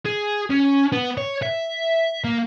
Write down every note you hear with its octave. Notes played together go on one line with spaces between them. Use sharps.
G#4
C#4
B3
C#5
E5
A#3